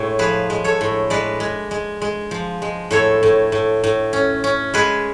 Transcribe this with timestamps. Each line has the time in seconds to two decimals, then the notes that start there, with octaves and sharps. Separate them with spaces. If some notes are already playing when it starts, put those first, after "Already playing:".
Already playing: A2 G#3 C#5
0.19 F3 G#4 B4
0.50 G#3
0.64 A4 C#5
0.81 A2
1.10 G#3 B4 D5
1.40 G#3
1.71 G#3
2.02 G#3
2.31 F3
2.62 G#3
2.91 A2 A4 C#5
3.23 A2
3.52 A2
3.84 A2
4.13 C#4
4.44 C#4
4.74 G#3 G#4 B4